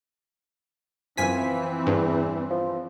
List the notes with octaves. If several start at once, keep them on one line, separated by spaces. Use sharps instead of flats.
F#2 E3 F3 C4 G#5 B6
E2 G2
F3